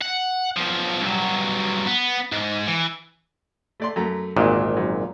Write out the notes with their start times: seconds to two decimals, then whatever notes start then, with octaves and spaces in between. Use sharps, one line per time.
0.02 F#5
0.57 B1 F3
1.02 G2 F#3
1.87 B3
2.32 G#2
2.67 E3
3.80 A3 D5 C6
3.96 F#2 A3 A#5
4.36 G#1 D2 A#2 D#5 D6
4.77 F#2